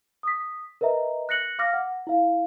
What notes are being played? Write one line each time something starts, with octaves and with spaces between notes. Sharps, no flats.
D#6 B6
A#4 B4 D#5 E5 A#5
F#6 A#6 C#7 F#7
F5 D6 F6 A#6
F#5
E4 F5